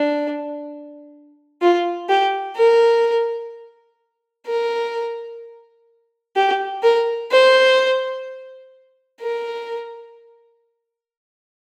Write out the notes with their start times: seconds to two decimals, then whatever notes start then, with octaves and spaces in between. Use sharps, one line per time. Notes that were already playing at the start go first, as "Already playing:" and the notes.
Already playing: D4
1.62 F4
2.09 G4
2.56 A#4
4.46 A#4
6.36 G4
6.83 A#4
7.31 C5
9.21 A#4